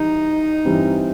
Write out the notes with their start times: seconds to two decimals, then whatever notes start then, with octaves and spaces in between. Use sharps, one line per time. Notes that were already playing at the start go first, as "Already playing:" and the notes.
Already playing: E3 G3 D#4
0.65 G2 E3 G3 C4